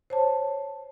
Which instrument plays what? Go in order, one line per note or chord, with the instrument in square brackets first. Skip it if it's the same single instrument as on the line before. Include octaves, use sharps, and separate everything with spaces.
[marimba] C5 C#5 A5